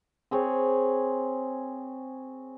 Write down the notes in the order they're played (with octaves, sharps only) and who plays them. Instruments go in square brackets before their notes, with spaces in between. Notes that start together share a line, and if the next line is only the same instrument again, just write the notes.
[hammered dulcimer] C4 G#4 C#5